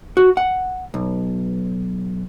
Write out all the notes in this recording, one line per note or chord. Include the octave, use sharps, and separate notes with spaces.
F#4
F#5
B1